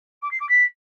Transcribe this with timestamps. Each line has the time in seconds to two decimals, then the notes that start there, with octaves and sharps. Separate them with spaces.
0.22 D6
0.31 C7
0.40 D6
0.49 B6